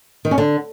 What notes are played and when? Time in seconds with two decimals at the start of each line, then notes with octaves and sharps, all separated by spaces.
0.25 D#3
0.31 C#4
0.38 D3